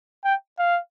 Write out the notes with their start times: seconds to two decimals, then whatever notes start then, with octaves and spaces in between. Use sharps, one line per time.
0.25 G5
0.59 F5